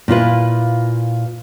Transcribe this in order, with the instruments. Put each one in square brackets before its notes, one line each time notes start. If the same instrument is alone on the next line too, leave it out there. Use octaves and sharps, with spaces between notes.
[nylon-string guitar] A#2 E4 F4 B4